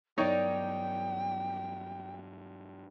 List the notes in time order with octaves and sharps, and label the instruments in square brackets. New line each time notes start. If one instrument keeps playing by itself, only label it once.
[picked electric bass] G2 F#3 B3 [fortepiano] D#4 C#5 [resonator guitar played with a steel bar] A#4 D5 [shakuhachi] G5